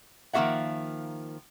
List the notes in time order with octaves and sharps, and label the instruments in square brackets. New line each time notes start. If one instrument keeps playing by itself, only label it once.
[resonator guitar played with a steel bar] D#3 F3 A#3 G4 E5 F#5